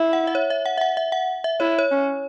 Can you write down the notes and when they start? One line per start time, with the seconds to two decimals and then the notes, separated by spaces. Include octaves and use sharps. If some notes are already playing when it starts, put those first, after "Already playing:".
Already playing: E4
0.13 F#5
0.27 E5
0.35 C#5
0.50 E5
0.66 F#5
0.78 E5
0.81 F#5
0.97 E5
1.12 F#5
1.44 E5
1.60 E4 C#5
1.79 C#5
1.91 C#4